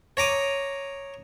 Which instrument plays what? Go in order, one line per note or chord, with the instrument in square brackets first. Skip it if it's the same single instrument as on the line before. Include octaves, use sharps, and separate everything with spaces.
[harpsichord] C#5 A#5 D6 D#6